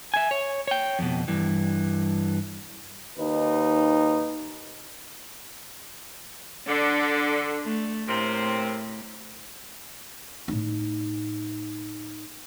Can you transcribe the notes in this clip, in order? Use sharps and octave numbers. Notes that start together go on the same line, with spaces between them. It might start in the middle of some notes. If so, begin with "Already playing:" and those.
E5 G#5
C#5
C#5 G5
F2 B2
G2 E3
D#2 D#4 B4
D3 D4
A3
A2 C3 A#3 C4
A2 D#4